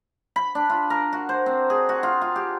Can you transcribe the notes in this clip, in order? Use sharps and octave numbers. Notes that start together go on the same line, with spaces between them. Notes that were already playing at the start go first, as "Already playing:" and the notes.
B5
D4
F4
A#4
F#4
C5
C4
G#4
F#4
F4
F4
G4